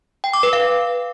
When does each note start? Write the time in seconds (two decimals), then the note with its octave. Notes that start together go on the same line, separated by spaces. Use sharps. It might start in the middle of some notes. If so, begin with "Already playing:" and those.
0.24 G5
0.33 D6
0.43 B4
0.53 F5